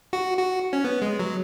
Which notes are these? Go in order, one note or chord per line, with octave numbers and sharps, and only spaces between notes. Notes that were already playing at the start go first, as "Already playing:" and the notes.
F#4
F#4
C#4
B3
G#3
F#3